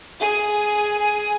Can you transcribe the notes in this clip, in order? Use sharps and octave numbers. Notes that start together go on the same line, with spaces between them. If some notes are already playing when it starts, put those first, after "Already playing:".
G#4